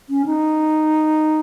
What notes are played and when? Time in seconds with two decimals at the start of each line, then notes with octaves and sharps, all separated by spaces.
0.09 C#4
0.26 D#4